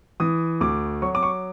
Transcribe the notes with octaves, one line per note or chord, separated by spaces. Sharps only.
E3 D#6
D2 D6
F#3 C#6
D6
C#6